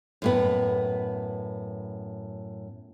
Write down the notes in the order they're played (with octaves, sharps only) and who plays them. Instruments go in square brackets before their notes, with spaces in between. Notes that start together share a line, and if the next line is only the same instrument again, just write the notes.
[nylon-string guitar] F#2 A2 B3